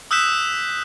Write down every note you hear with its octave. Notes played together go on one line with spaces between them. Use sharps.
D#6 E6 F#6 G6 B6 E7